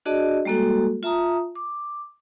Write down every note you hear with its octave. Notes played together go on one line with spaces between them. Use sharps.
D4 F#4 G#4 D5 D#5 A5
G3 G#3 A#3 F#4 A4
F4 E5 A5 A#5 D#6
D6